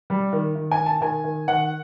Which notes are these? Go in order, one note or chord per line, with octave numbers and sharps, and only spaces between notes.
G3
D#3
D#3
G#5
D#3
A5
D#3 G#5
D#3
D#3 F#5